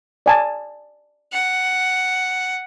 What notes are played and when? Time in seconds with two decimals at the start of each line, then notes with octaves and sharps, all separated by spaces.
0.26 D5 G#5 A5
1.32 F#5